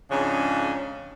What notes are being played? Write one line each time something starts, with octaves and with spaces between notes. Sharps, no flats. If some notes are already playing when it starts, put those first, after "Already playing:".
F2 G#2 C#3 C#4 D4